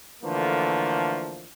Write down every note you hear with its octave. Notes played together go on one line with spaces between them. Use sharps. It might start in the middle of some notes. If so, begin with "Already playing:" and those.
D3 E3 F3 A3 A#3